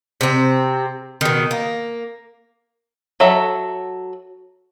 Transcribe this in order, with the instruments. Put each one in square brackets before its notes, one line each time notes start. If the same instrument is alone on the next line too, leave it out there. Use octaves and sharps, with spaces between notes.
[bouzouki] C3 C4
B2 D#3
A#3
[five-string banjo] F#3 A4 E5